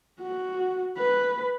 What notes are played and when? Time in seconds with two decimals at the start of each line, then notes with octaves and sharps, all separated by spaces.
0.21 F#4
0.98 B4